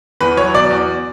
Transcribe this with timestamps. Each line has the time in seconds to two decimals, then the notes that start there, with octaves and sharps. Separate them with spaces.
0.21 E2 B4
0.37 F#3 C#5
0.54 B2 D5
0.70 E2